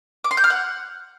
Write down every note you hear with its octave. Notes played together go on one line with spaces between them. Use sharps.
D6
C6
G6
F6
F#5